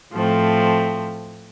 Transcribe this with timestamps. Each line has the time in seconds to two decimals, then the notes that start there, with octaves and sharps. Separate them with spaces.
0.13 A2 F3 A3 C4